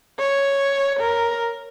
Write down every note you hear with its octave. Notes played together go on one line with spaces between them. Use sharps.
C#5
A#4